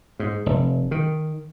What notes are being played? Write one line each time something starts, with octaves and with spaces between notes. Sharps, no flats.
G#2
F1
D#3